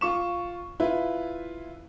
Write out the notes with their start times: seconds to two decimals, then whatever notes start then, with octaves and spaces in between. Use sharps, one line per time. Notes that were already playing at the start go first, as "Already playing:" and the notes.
0.01 F4 C#6 E7
0.80 E4 F4 B4